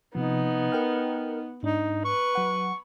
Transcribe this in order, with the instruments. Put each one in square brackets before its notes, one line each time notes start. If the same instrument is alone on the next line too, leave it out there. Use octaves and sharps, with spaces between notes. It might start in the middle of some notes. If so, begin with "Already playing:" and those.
[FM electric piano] C3 F3 [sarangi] B3 [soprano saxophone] D#4
[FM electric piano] A#4 G5 F6
[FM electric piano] G#2 D4 [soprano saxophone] D#4
[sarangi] B4 [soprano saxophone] C#6
[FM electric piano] F#3 F#5